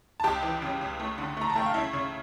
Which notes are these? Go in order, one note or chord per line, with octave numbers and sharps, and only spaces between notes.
A5
C#2 G4 G5
E3
C#3
C#2
A3
D3
A3 A#5
A5
A3 G5
F5
C#3 E4 E5
C#3